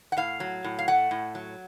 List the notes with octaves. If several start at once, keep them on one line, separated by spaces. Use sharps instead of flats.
F#5
A2 F5
F#3
A2
F5
A3 F#5
A2
F#3